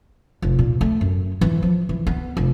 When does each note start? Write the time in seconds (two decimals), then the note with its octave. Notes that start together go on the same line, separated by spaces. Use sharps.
0.42 F1
0.59 A#2
0.81 A3
1.01 F#2
1.41 E3
1.63 F3
1.89 E3
2.07 B3
2.37 F1